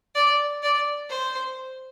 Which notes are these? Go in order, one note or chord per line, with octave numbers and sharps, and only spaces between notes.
D5
D5
C5